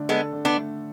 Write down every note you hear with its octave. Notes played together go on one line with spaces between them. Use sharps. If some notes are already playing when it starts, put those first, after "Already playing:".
Already playing: D3 A3 D4
G#3 B3 A4
D3
B3 D4
A3